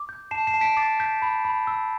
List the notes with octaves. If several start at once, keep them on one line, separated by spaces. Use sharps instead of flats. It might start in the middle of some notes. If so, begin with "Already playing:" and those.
Already playing: D6
G6
A5 C7 E7
C7 E7
A5
B6 D7
D6 A6 C7
G6 B6
B5
B5
E6